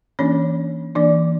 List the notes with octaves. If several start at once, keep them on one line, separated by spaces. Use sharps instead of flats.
E3 A#3 C#4 D4 C#5
E3 A#3 D4 D5